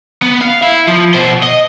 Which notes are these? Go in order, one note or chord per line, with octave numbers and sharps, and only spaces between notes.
B3
F5
E4
F3
B2 C5
D#5